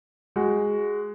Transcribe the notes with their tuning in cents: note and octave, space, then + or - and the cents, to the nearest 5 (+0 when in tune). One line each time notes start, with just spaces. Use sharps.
G#3 +0 F#4 +10